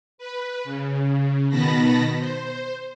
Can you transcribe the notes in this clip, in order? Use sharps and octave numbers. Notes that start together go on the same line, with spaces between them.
B4
C#3
B2 D#3 B3 A5 B5 A#6
C5